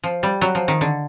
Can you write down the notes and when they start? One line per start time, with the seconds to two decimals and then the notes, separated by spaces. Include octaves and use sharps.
0.04 F3
0.23 G3
0.41 F#3
0.55 F3
0.68 D#3
0.81 D3